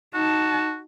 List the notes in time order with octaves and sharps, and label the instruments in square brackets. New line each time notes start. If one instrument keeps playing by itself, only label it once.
[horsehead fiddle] D#4 A5 [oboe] F#4